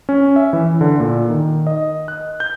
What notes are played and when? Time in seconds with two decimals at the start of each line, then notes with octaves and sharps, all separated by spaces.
0.09 C#4
0.36 E5
0.53 E3
0.81 D3
1.00 A#2
1.30 D#3
1.67 D#5
2.08 F#6
2.40 G6